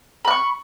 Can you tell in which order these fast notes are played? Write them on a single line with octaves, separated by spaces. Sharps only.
B5 F#6 C#6